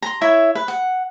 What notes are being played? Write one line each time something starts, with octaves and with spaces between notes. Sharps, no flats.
A#5 C6
E4 C#5 E5
B4
F#5